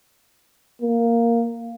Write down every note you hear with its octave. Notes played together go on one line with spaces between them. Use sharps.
A#3